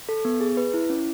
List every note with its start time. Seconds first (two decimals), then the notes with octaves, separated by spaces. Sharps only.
0.09 A4
0.25 B3
0.41 G#4
0.57 B4
0.74 E4
0.90 C#4